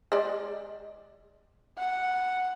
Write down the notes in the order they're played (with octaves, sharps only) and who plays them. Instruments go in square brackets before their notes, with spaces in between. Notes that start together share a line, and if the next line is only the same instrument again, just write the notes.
[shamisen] G#3 D5
[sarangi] F#5